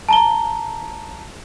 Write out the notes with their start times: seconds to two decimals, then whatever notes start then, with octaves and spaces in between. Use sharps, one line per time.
0.09 A5 A#5 G7